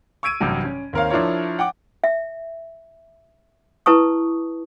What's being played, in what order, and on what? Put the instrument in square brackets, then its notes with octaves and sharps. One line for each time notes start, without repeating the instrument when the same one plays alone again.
[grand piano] C#6 E6 G#6 D7 D#7
A1 G2 C3 F#3 G3
C#4
D#2 C4 A#4 C#5 F5
F3 D4 E4 F4 A#4 C#5
F#5 G5 D6
[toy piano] E5
E4 B4 A5 C#6 D#6